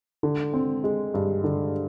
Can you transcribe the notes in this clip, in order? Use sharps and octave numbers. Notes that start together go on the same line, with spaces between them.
D3
C4
G#3
G2
D3